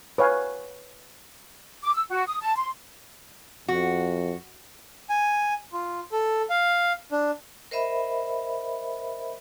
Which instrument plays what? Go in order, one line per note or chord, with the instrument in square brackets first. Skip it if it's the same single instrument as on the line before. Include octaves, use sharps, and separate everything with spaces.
[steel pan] B4 C#5 F5 G#5
[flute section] D6
E6
F#4
D#6
A5
C6
[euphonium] F2 [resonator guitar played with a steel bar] F#4
[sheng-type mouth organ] G#5
F4
A4
F5
D4
[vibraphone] A#4 C5 D#5 E5 B5